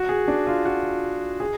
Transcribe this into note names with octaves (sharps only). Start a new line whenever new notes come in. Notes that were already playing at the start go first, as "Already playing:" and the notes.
Already playing: F#4
G#4
D4
F4
F#4
G#4